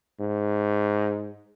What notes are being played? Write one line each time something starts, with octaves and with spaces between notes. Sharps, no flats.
G#2